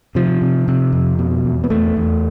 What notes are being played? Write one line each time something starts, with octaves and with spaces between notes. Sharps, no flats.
C3 F3
C3
C3
F2
B2
E2
B3
E2 A3
E2